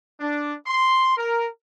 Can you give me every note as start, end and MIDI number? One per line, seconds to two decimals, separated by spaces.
0.21 0.55 62
0.67 1.14 84
1.17 1.46 70